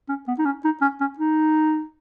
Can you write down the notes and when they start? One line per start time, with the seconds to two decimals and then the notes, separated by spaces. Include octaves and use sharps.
0.09 C#4
0.28 B3
0.38 D#4
0.45 C#4
0.64 D#4
0.81 C#4
1.00 C#4
1.18 D#4